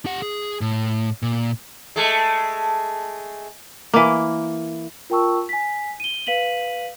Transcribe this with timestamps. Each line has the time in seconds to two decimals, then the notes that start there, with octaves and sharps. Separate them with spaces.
0.06 G4 F#5
0.22 G#4
0.61 A2
1.22 A#2
1.96 G#3 A3
3.94 E3 A#3
5.10 F4 A#4 G5 A5 C#6 E6
5.49 G#5 B6
6.00 D#7 G7
6.27 B4 F5 B6 D#7 F#7